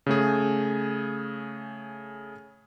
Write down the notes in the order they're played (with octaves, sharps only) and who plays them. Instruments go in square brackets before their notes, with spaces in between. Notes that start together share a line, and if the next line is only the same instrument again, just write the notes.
[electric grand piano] C#3 A3 G#4